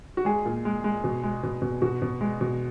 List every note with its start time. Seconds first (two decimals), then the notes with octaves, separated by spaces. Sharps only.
0.17 F#4
0.25 G#3 G#4
0.46 A#2
0.65 G#3
0.84 G#3
1.04 B2
1.23 G#3
1.43 B2
1.62 B2
1.82 B2 F#4
2.02 B2
2.21 G#3
2.41 B2